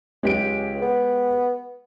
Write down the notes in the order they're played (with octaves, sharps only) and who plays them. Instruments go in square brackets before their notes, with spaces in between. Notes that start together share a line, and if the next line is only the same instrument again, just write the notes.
[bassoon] C#2 [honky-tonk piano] G#3 G4 D7
[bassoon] B3